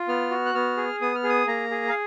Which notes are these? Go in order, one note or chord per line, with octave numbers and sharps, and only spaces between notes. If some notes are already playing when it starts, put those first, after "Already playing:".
Already playing: F4
B3 F6
F#4
F#6
B3 F6
G#4
B3 D#6
F6
G#4
D#6
A#3 A#5
G#4
F5